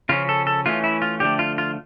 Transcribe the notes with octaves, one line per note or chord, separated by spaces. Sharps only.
C#3 F3 C#4 F4
A4
A4
E3 A3 C#4 F4
E4
F4
D3 F3 A3 G4
F4
F4